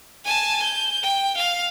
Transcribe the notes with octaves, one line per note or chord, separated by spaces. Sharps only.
G#5 A5
G6
G5
F5